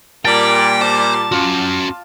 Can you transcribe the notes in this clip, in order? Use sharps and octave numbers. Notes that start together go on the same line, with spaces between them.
A#2 G3 A#4 D5 G5 A5
C5 A5 D6
C#4 F4 F#4